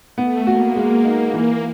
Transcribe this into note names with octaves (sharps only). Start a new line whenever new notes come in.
A3 B3
A#3 F#4
G#3
D#4
E3 A#3